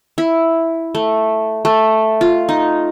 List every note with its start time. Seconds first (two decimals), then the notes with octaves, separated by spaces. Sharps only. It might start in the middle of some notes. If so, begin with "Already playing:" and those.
0.18 E4
0.95 A3
1.65 A3
2.21 F4
2.49 D#4